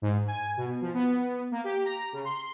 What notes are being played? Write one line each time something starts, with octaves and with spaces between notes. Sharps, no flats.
G#2
G#5
B2
F3
B3
A#3
G4
A#5
C#3
C6